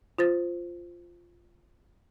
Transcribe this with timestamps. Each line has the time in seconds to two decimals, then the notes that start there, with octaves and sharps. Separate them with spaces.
0.19 F4 C5 A6